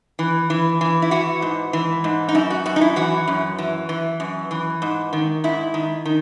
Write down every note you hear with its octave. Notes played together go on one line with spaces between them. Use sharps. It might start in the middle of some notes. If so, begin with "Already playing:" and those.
E3
E3
E3
E4
E3 F#4
G#2
E3
G#2
D#4
F#2 E4
F#4
F#2 F#4
D#4
E4
E3 F#4
F#2
E3
E3
F#2
E3
G#2
D#3
G#2 E4
D#3
D#3